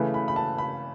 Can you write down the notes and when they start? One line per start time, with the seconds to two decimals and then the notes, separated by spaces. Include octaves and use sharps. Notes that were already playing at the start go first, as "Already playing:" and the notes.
Already playing: C#3 E3 A3 B4
0.14 B5
0.28 B5
0.36 A5
0.58 B5